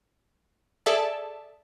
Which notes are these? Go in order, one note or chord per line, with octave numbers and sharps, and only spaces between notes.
G#4 A4 D5 E5 A5